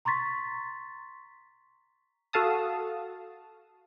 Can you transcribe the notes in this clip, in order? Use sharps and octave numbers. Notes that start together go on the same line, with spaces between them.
A#5 C6 C#6 A6 B6
F#4 A4 F5 A5 D#6